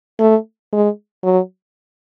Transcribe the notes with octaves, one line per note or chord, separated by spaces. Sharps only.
A3
G#3
F#3